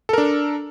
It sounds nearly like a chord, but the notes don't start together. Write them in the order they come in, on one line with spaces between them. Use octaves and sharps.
A4 A#4 D4